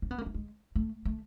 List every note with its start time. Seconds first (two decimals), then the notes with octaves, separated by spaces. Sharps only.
0.02 C4
0.11 B3
0.18 A#3
0.26 A3
0.34 G#3
0.75 A3
1.05 A3